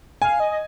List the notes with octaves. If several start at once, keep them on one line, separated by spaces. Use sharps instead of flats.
F5 G#5
D#5
D#5